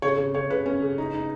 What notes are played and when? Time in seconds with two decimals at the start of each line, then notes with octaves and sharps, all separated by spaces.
0.02 C#3 C#5
0.18 C#3
0.34 C#3 C#5
0.50 C#3 B4
0.66 C#4
0.82 C#3
0.98 D#4
1.14 D#4